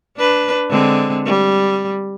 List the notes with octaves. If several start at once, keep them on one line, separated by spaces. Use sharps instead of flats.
D4 B4
D3 G#3 C4
G3